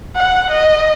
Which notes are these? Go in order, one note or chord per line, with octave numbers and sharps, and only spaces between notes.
F#5
D#5